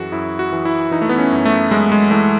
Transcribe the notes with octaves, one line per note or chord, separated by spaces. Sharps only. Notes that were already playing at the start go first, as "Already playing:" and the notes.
Already playing: F#2 E3 F#4 G#4
F#2 E4
F#4
E3
E4
E3 D#4
A3
B3
C#4
F#2
A3
F#2 G#3
G#3
E3 A3